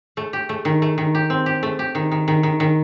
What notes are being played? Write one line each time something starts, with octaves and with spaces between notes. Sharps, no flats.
A3
G4
A3
D#3
A3
D#3
G4
C4
G4
A3
G4
D#3
D#3
D#3
D#3
D#3